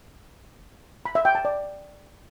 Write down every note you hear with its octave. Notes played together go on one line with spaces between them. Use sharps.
B5
E5
G5
A5
D5